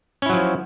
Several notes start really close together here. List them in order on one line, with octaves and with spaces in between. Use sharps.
C#4 E4 F#3 F3